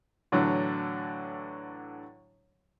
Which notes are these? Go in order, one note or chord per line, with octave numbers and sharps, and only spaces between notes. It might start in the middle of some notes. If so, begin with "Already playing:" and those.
A2 D3 E3 F#3